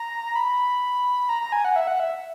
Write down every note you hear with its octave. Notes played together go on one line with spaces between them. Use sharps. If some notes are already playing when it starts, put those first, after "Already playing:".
Already playing: A#5
B5
A#5
A#5
G#5
F#5
E5
F#5
E5